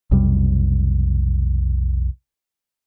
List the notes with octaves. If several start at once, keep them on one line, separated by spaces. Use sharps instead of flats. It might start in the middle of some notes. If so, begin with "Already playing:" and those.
B1 F2 C3 G3